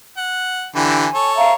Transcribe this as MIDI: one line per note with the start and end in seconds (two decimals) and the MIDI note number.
0.17 0.65 78
0.75 1.06 50
0.75 1.06 52
0.75 1.06 67
0.75 1.31 80
1.14 1.53 69
1.14 1.53 73
1.36 1.52 76
1.36 1.52 77
1.36 1.52 82